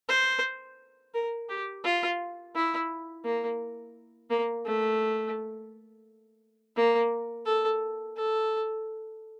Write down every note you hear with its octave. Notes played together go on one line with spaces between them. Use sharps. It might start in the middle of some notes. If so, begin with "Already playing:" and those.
C5
A#4
G4
F4
E4
A#3
A#3
A3
A#3
A4
A4